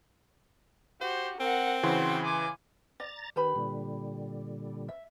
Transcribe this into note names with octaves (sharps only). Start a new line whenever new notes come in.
F#4 G4 C5
C4 A#4 F#5
C#3 E3 F#4 C5 C6
G#5 D6
D5 A#5 A6
D#3 G4 B4 B5
A#2 D3 G3
E5